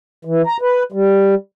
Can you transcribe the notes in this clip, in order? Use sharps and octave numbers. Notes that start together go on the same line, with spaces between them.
E3
A#5
B4
G3